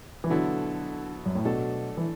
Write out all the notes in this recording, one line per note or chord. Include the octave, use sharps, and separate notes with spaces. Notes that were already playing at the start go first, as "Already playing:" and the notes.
E3
B2 D3 F#3 B3 E4 A4
F#2
A2
B2 F#3 A3 D4 A4
E3